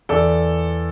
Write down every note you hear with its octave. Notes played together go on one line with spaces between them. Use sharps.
E2 A4 D5